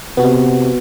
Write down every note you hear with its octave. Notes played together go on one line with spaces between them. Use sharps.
C3 B3 F#4